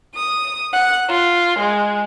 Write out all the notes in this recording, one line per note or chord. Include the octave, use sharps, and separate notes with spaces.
D#6
F#5
F4
G#3